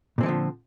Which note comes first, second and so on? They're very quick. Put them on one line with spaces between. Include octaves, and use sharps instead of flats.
A#2 C4 E3 F3 D3